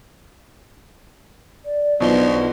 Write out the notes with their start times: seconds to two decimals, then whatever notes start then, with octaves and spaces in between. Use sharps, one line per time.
1.65 D5
2.00 B1 B2 F3 D4 D#5 G7